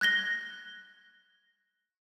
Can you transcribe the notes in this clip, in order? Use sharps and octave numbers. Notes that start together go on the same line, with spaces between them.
F#6 G#6 A#6 G7